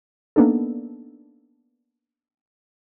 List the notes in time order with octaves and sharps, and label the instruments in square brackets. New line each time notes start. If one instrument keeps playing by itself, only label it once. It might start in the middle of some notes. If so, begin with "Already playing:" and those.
[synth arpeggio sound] A#3 B3 D4 D#4 A4